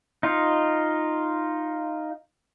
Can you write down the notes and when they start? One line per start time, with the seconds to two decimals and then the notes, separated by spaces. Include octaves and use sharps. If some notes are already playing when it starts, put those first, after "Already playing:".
0.23 D#4 F4